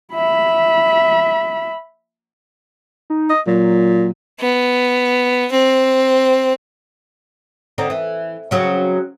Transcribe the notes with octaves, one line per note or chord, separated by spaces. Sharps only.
E5 B5
D#4
D#5
A#2 F#3
B3
C4
D3 C4 D#4
E3
C#3 F#3 C4